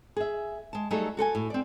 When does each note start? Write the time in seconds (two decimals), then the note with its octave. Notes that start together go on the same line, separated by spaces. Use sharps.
0.17 G#4 E5
0.73 G#3 A5
0.91 F#3 G3 A3 D#4 G#4 A4
1.17 F#4 A4 B4 G#5
1.35 A2
1.50 C4 D5